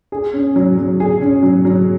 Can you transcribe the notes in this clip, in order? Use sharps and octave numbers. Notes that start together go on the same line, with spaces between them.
G#4
C#4
F#3
F#3
G#4
C#4
F#3
F#3